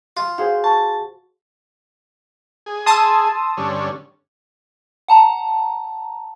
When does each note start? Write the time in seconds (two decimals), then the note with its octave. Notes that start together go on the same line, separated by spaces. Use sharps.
0.17 F4
0.38 F#4 G#4 C5 F5
0.64 A5 C#6
2.66 G#4
2.86 A5 C6 D#6 E6
3.57 G2 D3 C#4
5.08 F#5 A5 A#5